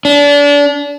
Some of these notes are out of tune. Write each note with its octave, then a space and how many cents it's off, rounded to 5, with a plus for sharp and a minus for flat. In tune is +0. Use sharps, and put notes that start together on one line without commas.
D4 -30